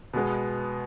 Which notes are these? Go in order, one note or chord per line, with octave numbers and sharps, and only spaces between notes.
B2 G#3 B3